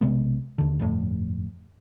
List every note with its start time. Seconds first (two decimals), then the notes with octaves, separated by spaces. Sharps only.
0.01 B1 C3 G#3 B3
0.58 D#2 D3
0.79 G1 F2 A2